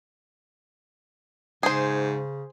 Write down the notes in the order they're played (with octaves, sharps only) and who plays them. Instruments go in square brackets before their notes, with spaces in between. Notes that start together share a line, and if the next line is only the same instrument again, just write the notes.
[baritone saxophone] G#2 [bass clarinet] C#3 [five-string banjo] G#4 C5